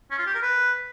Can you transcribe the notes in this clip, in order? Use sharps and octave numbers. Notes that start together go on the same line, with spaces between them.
C#4
F4
G4
A#4
B4